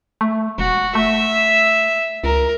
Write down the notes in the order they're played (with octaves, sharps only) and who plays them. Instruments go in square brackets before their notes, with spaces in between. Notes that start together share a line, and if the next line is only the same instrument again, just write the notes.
[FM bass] A3
[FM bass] E1 [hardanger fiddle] F#4
[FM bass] A3 [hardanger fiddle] E5
[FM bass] C#2 [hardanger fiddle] A#4